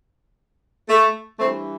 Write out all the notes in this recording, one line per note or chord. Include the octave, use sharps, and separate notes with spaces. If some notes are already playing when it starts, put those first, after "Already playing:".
A3
G2 E3 A3 C4